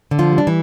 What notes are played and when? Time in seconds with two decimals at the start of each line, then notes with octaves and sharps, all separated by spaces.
0.11 D3
0.19 F3 F4
0.32 G3
0.38 D4
0.47 E3